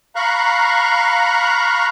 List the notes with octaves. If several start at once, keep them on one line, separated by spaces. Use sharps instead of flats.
F5 A#5 B5 C#6 F#6